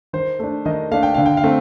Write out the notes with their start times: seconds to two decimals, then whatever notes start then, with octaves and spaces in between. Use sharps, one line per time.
0.13 D#3 C5
0.39 A3 D4
0.65 D#3 D#5
0.91 A3 D4 F5
1.03 G5
1.14 D3 F5
1.26 G5
1.37 F5
1.44 A3 C4